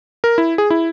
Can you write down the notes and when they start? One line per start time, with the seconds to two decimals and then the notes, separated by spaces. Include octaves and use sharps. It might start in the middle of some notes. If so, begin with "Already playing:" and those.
0.24 A#4
0.38 E4
0.58 G#4
0.70 E4